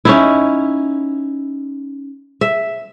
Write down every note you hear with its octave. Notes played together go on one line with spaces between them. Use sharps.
C#4 D#4 E4
E5